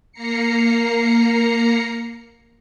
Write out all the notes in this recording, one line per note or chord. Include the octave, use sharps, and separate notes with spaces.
A#3 A#5 C7 C#7